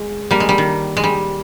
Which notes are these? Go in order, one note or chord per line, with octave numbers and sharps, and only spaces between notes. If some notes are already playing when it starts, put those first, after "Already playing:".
Already playing: G#3
G3 A#3
G#3
G3
D#3
G#3
G3